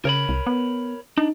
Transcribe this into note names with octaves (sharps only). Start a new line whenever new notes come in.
C#3 A#4 C#5 B5
C2
B3
D4 D#4